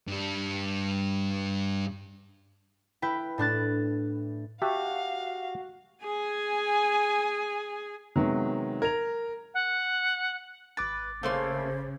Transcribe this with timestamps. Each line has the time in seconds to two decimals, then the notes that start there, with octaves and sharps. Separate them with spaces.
0.07 G2 G3
3.02 E4 B4 G5
3.38 A2 D4 F#6 A6
4.62 F#4 G4 E5 F5 A5
6.03 G#4 G#5
8.16 C3 D#3 F#3 G#3 B3
8.82 A#4 G#6 F7
9.54 F#5
10.77 G#1 B4 D6 A6
11.23 C#3 A3 A#3 C5 C6